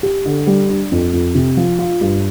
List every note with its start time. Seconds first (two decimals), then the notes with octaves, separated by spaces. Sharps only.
0.03 G4
0.25 D3
0.47 G3
0.69 D4
0.92 F2
1.13 F2
1.35 C3
1.57 F3
1.79 F4
2.01 G2